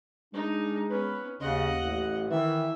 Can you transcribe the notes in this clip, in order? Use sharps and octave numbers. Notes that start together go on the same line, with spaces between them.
G#3 D4 D#4
B3 C#4 B4
D#2 C#3 D#5 F#5
A1
D#3 E3 E5